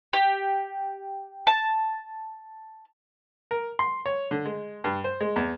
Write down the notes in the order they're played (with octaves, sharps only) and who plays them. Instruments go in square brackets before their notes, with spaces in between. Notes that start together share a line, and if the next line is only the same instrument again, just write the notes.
[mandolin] G4
A5
[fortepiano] A#4
C6
C#5
D3
G#3
G2
C5
G#3
E2